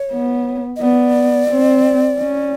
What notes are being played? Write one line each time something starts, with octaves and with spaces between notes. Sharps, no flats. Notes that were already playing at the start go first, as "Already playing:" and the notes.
Already playing: C#5
B3
D#5
B3 D5
C4
C#4